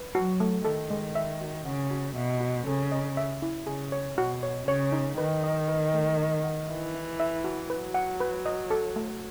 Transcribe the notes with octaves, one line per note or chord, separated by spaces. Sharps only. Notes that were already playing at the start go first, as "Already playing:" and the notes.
Already playing: B4
F#3 F#4
A3
D#3 A4
G#3
E5
F#4
C#3 F#5
F#4
B2 E5
F#4
C#3 A4
D#5
E5
E4
C#3 G#4
C#5
B2 F#4
C#5
C#3 C#5
D#4
D#3 B4
D#5
B4
A3
D#5
F#5
E3 E5
E4
E5
F#4
F#3 B4
F#5
B4
D#5
A4
A3